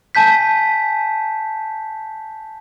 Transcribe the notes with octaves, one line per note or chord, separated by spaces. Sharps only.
G#5 A5 G6 B6